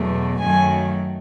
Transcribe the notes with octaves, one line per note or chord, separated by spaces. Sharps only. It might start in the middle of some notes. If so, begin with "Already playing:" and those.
Already playing: E2 B2 F#3 A3
F#2 D#3 F#3 A3 G#5